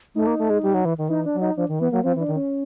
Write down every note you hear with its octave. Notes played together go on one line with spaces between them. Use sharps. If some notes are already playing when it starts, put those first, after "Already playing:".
A3 D#4
A#3
A3
G#3
G3
F#3
E3
D#3
E3 D#4
D4
F#3
D#4
F3 D4
D#3
E3 B3
F#3 A#3
F3 C4
E3
D4
D#3
C#4